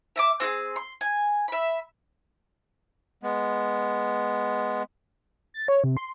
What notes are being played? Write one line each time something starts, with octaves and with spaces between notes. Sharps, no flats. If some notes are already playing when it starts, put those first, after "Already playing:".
E5 A#5 D6
C4 F#4 G#4
C6
G#5
E5 B5
G#3 B3
A6
C#5
C3
C6